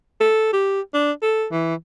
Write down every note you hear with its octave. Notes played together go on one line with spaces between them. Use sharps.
A4
G4
D4
A4
E3